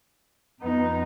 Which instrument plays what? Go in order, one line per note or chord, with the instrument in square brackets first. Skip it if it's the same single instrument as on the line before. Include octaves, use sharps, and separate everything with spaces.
[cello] F2 D#4 [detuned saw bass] B3